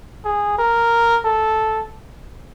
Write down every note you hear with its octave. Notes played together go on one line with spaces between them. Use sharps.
G#4
A#4
A4